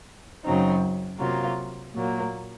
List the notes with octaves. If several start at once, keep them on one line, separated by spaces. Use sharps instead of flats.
F#2 C#3 F#3 C4 D#4
C3 F#3 A#3 F4
A#2 F#3 A#3